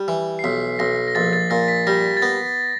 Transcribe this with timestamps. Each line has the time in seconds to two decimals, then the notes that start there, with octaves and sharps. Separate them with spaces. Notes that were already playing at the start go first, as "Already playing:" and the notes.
Already playing: G3
0.08 E3
0.39 C7
0.44 B1 B6
0.79 B1 A#6
1.08 A#6
1.15 A#1 A6
1.33 A6
1.50 A#2 A#6
1.68 B6
1.87 G3 A#6
2.17 A6
2.22 B3 A#6